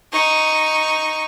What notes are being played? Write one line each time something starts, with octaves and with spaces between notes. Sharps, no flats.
D#4 C#6